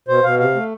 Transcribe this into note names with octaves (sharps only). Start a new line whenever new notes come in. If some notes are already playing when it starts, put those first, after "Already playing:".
B2 C5
B2 F5
C3 F5
A3